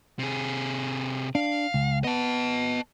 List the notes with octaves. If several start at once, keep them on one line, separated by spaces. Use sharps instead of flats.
C3 G#4
D4 F5
C#2
B3 D#5 A5